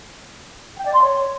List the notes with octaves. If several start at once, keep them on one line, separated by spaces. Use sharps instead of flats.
G5
D5
C6
C#5